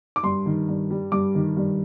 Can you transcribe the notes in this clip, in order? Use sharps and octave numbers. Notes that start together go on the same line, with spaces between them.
D6
G2 C6
D#3
G2
G3
G2 D6
D#3
G2